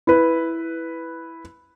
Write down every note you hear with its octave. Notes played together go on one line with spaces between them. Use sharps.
E4 B4